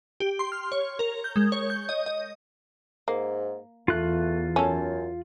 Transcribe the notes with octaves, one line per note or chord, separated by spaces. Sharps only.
G4
C6
F6
C#5
A#4
G6
G#3
C#5
G6
D#5
D#5
G#2 A#3
E2 A3 F4 F#6
F#2 C#4 A4